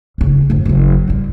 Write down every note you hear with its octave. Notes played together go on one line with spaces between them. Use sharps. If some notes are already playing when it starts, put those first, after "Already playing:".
F#1 C#3
G1 F2
F#1 F#3
F#2 G3